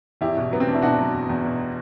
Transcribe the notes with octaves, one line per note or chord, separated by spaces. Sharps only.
E2 E4 G4
B2
F#3 B3
C4
E2 D4
E4
B2 D4 F#4
F#3
E2
E2
B2